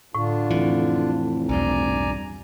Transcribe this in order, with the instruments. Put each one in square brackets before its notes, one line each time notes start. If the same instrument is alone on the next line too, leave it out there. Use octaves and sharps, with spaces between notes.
[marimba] A2 [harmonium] D3 D4 F4
[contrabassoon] F1 [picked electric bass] E3
[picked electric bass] B1 E2 G2 [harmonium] D5 G#5 A#5